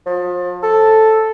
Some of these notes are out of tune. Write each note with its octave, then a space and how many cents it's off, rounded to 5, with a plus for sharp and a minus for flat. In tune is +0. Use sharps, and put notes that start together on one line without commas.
F3 +35
A4 +0